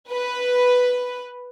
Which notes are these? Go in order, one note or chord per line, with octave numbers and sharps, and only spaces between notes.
B4